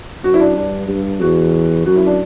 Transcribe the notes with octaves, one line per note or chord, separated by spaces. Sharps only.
F#2 F#4
E4
D4
G2 D4
G2
E2 F#4
F#2 F#4
E4
D4